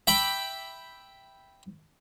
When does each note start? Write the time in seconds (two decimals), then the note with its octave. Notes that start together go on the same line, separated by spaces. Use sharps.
0.07 E5 G5 B5 D6